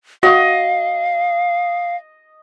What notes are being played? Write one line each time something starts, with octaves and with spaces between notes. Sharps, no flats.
F#4 D#5 F5